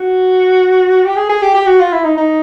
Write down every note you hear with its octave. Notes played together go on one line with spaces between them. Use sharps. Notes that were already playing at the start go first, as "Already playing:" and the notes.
Already playing: F#4
G4
G#4
G#4
G4
G4
F#4
F4
E4
D#4
D#4